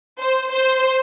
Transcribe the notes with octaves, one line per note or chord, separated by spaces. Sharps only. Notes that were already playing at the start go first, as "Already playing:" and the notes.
C5
C5